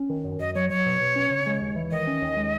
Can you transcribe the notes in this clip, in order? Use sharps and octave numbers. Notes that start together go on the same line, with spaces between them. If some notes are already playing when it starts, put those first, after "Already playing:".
Already playing: C#4
D#3
F#2
F#2 D#5
F#3 C#5
F#3 C#5
B2
B2
C#4
C#3
G#3
D#2
E3
D#3 D#5
C#4
D#2
G#3